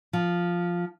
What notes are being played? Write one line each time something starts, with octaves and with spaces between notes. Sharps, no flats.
F3